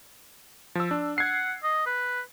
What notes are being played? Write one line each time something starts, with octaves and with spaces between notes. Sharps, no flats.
F3 E6
D4
F#5 G#6 C7
D#5
B4